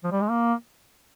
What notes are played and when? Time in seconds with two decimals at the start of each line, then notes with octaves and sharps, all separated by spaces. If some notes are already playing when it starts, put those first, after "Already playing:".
0.04 F3
0.12 G3
0.21 G#3
0.30 A#3